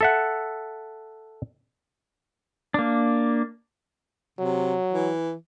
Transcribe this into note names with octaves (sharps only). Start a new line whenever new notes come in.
A4 E5 F#5
A#3 D4
C3 F#3
E3